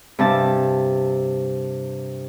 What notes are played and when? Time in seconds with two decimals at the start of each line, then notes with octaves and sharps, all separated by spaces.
0.19 G2 C3 A5